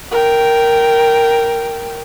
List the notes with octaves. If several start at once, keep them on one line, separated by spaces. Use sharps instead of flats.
A#4 G5